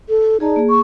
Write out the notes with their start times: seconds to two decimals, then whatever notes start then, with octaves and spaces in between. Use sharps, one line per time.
0.09 A4
0.40 D#4 G#4 D5 A5
0.56 A#3 G#4
0.70 C#6